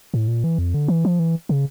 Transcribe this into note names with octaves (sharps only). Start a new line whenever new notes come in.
A2
A#2
E3
F2
D3
E3
F3
E3
C#3